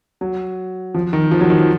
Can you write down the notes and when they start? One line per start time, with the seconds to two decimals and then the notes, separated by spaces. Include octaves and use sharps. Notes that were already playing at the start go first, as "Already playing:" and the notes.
0.21 F#3
0.94 F3
1.13 D#3
1.31 F3
1.40 F#3
1.50 D#3
1.59 F3